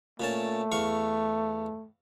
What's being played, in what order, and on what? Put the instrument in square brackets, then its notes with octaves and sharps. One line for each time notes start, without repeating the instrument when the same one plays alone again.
[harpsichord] A#2 C#4 A5 [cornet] A3
[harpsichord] E2 F5 C#6